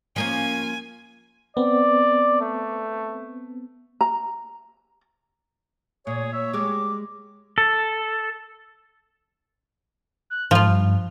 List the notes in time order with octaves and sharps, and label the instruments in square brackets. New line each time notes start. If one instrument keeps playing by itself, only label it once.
[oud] F3 A#3 C#4 [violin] G#5
[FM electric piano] B3 C4 [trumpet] D5
[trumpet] A3
[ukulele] A#5
[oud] A#2 [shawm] G#4 [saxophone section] C#5
[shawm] E5
[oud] G3 G#3 [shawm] D6
[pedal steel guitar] A4
[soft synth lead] F#6
[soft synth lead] G#2 [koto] F3 F4
[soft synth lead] G2